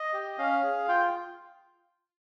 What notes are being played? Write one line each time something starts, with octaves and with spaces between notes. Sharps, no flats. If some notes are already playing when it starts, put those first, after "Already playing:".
Already playing: D#5
G4
C#4 F5
G#4
F4 G5